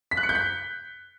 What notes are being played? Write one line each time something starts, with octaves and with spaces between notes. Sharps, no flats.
B6
F#6
C#7
G6
B6